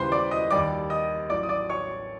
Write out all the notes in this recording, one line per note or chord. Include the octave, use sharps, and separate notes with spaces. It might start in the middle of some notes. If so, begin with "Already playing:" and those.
Already playing: D#2 C#3 E3 G3 B4 C5 C6
D5 D6
D#5 D#6
D#2 D#3 G3 D5 D6
D#5 D#6
A1 A2 F#3 D5 D6
D#6
D5 D6
C#5 C#6